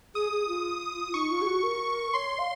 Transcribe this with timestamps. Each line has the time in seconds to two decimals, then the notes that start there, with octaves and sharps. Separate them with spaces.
0.15 G#4 D#6
0.32 G#4
0.48 F4
1.13 D#4 C#6
1.31 F4
1.42 G#4
1.47 F#4
1.63 A#4
2.13 C#5 C6
2.39 F5